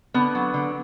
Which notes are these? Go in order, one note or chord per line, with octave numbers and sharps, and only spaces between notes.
D3 B3
F#3
D3